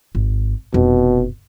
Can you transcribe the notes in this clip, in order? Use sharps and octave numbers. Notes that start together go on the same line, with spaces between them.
G#1
F1 B2